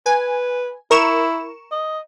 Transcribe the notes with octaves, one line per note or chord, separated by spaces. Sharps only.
B4 G#5
E4 A#4 C#6 E7
D#5